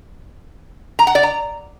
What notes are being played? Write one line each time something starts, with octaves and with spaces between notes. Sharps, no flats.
A#5
F#5
D5
A#5